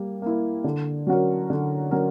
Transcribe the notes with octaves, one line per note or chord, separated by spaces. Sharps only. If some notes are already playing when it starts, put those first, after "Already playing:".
Already playing: G3 A#3
A#3 E4
D3
F#3 C#4 F#4 A#4
D3
F#3 C#4 F#4 A#4